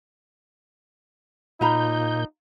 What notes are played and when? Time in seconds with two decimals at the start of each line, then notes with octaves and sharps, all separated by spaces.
1.61 A#2 D#4 F4 A#5 B5 G6